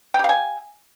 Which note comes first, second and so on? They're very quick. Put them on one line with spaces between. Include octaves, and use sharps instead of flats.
G5 G4 F5 G#5